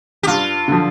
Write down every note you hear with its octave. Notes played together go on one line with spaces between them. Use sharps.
G4
G2 F4
D3 F3